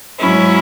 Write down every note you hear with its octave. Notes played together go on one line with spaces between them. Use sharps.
G#2 F#3 C#4 E4